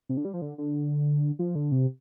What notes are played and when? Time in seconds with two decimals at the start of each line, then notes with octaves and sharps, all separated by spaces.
0.09 C3
0.17 D3
0.25 G3
0.33 F3
0.42 D3
0.58 D3
1.39 F3
1.55 D3
1.72 C3